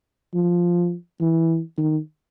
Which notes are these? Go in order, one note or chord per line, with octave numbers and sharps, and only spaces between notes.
F3
E3
D#3